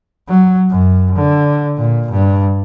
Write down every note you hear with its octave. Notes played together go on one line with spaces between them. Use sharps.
F#3
F#2
D3
A#2
G2